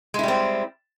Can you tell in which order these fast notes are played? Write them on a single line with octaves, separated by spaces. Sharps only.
G#3 E4 G3 C4